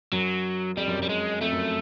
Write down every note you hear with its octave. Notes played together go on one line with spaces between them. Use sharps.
F#2 F#3
F2 G3
F#2
F#2 G3
G#3
F2 A3
F#2